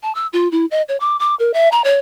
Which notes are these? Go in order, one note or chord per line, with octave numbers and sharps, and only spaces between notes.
A5
E6
F4
E4
D#5
C#5
D6
D6
A#4
E5
A#5
C#5